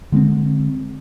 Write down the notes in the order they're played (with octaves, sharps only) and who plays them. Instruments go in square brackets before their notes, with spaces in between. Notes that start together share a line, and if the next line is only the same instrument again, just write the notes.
[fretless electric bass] D3 G#3 A#3 C4